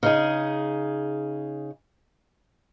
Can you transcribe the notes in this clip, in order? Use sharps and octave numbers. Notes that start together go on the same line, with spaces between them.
C#3 D#4 G#4